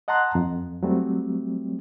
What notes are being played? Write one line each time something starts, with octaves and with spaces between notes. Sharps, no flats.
D#5 F#5 A5 A#5 C6 F#6
F2
F#3 G3 A3 C4